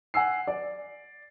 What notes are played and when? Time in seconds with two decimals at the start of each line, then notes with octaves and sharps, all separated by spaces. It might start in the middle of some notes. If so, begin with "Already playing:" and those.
0.14 F#5 G#5 E6 C7
0.47 D5